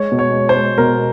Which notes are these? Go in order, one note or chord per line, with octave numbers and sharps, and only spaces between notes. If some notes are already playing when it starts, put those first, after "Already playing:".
Already playing: G#3 C#5
B2
C#5
G#3
C5
G#3
B2 A#4